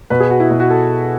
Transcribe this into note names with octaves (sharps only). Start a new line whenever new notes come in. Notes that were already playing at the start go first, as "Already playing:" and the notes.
B2 B4
G#4
F#4
E4
B2
F#4
A4